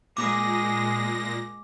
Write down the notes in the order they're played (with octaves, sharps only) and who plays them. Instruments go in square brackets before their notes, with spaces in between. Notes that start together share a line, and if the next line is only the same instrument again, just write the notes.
[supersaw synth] A#2 A#6 [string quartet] G#3 [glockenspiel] D6